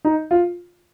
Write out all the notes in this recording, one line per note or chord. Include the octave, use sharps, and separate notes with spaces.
D#4
F4